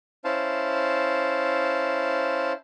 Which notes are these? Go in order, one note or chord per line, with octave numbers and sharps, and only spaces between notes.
C#4 E4 C5 F5 A5